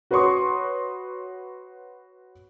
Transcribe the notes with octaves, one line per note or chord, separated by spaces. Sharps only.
F#4 B4 C#5 C6 C#6 D#6